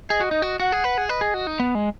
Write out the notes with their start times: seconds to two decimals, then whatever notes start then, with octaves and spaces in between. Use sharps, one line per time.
0.10 G#4 D#5
0.20 F#4
0.31 D#4
0.42 F#4
0.60 F#4 F#5
0.72 G#4
0.84 B4
0.98 G#4
1.09 B4 D#5
1.21 G#4
1.34 F#4
1.47 D#4
1.60 B3
1.75 G#3